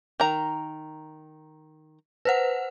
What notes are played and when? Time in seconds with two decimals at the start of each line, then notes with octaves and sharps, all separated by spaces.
0.20 D#3 A#5
2.25 B4 C5 F#5